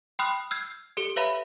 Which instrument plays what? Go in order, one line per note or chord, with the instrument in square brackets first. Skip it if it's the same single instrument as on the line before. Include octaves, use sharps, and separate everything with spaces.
[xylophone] G5 B5 C6 D#6 F6 F#6
E6 F6 G6 G#6 C7
G4 A4 C#7 G7
B4 C#5 E5 F5 A#5 B5